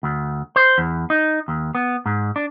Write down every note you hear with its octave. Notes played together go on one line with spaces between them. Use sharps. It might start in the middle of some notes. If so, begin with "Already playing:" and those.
D2
C5
E2
D#4
D#2
B3
G#2
D4